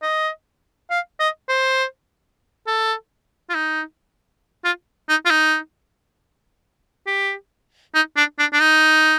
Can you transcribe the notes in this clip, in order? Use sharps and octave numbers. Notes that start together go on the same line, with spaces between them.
D#5
F5
D#5
C5
A4
F4
D#4
F4
D#4
F4
D#4
G4
D#4
D4
D4
D4
D#4